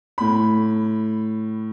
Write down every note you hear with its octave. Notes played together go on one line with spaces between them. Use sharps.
A2 B5